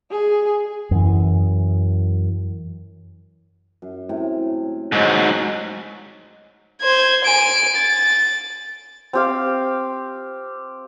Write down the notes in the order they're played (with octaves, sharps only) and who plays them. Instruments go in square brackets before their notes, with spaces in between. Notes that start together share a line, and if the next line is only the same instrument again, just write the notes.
[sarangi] G#4
[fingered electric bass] F#2 E3
[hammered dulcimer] F#2
A2 C3
[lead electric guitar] G#2 F#3 [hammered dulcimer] F#4 C5 D#5
[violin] C5 G#6
G#5 D7
A6
[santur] C4 G4 F5